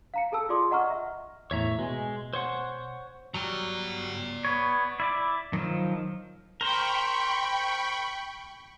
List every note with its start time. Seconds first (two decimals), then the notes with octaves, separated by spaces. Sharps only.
0.14 F5 A#5 C#7
0.32 G#4 A4 A5 E6
0.49 F4 G#4 D5 C6 D6 D#6
0.71 D#5 F#5 A#5 C#6 F6
0.90 E5
1.51 E2 A2 C#5 E5 A#5
1.79 B2 G#3 G#5
2.33 C5 C#5 F#5
3.34 F#3 G3 D5 A#5
4.45 B3 C#5
5.00 E4 D5 D6
5.53 D#3 F3 F#3
6.61 A#4 C5 G5 B5 C#6